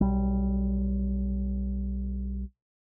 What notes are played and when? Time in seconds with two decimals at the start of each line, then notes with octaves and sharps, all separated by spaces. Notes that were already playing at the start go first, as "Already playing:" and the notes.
0.01 B1 G3